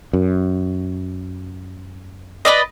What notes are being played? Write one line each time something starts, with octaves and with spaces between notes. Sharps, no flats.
F#2
B4 D5 D#5